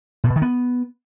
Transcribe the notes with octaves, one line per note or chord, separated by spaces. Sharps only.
A#2
B2
D#3
B3